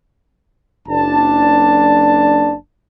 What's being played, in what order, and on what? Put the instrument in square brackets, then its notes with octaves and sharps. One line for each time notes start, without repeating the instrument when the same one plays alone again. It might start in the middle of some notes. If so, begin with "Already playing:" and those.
[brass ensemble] F#1 D4 A5